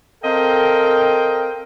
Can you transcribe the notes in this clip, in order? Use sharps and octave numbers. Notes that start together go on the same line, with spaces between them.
C4 A4 A#4 D#5 F5 G5